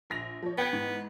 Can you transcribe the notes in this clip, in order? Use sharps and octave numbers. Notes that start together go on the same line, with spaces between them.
A#1 A#6 F7
F3 C#5
B3 G5 G#6
G#2 E3